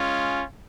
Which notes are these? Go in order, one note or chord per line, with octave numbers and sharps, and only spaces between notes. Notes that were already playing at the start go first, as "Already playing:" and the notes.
Already playing: G#3 C#4 F4